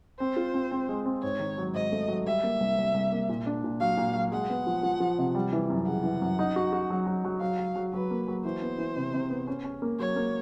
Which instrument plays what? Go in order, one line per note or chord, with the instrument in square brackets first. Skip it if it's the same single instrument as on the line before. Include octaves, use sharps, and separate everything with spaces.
[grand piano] C4 [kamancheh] C5
[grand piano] F4
C4
C4
G#3
C4
[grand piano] G#2 [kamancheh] C#5
[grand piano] D#3
F#3
[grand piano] G#2 [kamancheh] D#5
[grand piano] A3
F#3
[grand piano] G3 [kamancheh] E5
[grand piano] A#3
C2
C2
C2
A#3
A#2
D4
A#2
[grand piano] F#3 [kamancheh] F5
[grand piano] A#2
F#3
[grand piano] G#3 [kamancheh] F#5
[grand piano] B3
F3
F3
F3
C3
G3
E3
F#2
[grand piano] C#3 [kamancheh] F#5
[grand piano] E3
F#2
D#4
F#4
F#4
F#3
F#3
F#3
[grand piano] F#3 [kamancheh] F5
[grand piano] F#3
F#3
[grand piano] F#3 [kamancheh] B4
[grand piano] A#3
F#3
[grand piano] E3 [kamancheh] C5
[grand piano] B3
E3
C3
C3
B3
C#4
C#4
A#3
[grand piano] F#3 [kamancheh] C#5
[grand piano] A#3